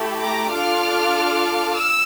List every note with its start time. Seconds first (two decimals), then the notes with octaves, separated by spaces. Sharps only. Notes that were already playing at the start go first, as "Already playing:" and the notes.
Already playing: A3 E4 G4
0.22 A#5 D6
0.52 D4 F4 A4 D6 F6
1.75 E6